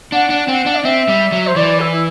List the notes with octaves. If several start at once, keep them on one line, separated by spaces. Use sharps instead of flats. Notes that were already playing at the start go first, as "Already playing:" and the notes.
D4 F#5
D4
C4
D4
D5
C4 E5
G3
F#3
C5
E3 D5
E4
E4